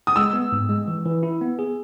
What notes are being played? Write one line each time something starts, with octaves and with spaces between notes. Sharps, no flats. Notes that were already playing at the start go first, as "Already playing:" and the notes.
D#6
G#3 E6
B3
G#2
G#3
E3
E3
E4
B3
G#4